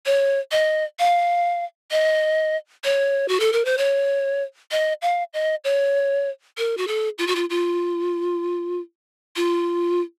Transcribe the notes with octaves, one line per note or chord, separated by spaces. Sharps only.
C#5
D#5
F5
D#5
C#5
F#4
A4
A#4
C5
C#5
D#5
F5
D#5
C#5
A#4
F#4
A4
F4
F#4
F4
F4
F4